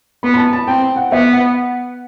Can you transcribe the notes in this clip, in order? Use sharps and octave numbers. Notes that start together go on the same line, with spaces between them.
B3 B5
B5
A5
A5
C4 G5
G5
F#5
B3 E5
F#5